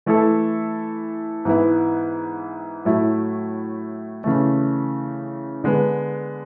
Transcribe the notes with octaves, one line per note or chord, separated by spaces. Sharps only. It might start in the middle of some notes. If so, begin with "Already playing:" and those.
E3 A3 E4 A4
G#2 E3 B3 E4
A2 F#3 A3 E4
C#3 E3 A3
D3 G#3 B3